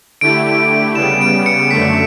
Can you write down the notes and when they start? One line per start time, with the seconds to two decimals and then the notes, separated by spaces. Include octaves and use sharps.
0.21 D3 A3 E4 G4 D7
0.95 C#3 G3 B3 E7
1.21 D7
1.46 C#7
1.71 F#2 D3 A3 B6